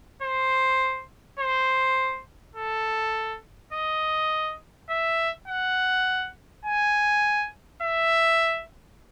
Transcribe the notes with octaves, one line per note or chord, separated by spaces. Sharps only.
C5
C5
A4
D#5
E5
F#5
G#5
E5